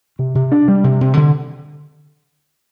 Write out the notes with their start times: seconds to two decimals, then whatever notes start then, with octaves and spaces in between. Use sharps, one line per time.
0.19 C3
0.35 C3
0.52 D4
0.68 G3
0.84 C3
1.01 C3
1.17 D3